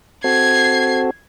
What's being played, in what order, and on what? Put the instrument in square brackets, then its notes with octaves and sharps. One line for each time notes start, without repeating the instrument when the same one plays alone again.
[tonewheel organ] C4 F#4 A4 [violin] G#6 C7